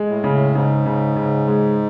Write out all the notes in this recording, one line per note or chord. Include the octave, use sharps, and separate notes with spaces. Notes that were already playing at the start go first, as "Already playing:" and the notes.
Already playing: G#3
A2
C#3
A2
G#2 C#3
C#3
C#3
G#3